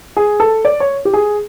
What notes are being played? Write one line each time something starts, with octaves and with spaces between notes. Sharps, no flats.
G#4
A4
D5
C#5
G4
G#4